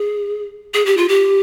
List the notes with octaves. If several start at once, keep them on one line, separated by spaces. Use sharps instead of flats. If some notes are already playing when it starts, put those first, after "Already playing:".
Already playing: G#4
G#4
G4
F4
G4